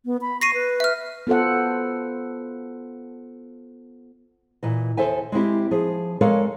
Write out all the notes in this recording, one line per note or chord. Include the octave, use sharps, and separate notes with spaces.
B3
B5
C#6 A#6 C7 D#7
B4
E5 F6
B3 F4 A4 C5 F#5
A#2 E3 D#5
D#2 G#3 A4 C5 E5 G#5
G#3 C4 E4 G4
F3 G#4
G#3 A4 A#4 C#5 D5 F5